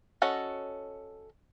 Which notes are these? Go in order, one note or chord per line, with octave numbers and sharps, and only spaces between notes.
C#4 F#4 A4 D#5